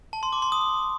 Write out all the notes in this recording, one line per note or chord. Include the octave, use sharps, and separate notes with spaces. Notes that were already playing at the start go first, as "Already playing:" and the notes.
A5
C6
D6
C6
D#6